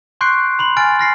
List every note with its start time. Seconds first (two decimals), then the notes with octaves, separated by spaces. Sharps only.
0.21 C6 C#6 F#6 G6 C7 D7
0.59 B5 C6 F#7
0.77 G#5 F6 A6 D7
0.99 F6 A#6 C7